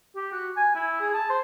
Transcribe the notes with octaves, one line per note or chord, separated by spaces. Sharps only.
G4
F#4
G#5
E4
G#4
A5
C5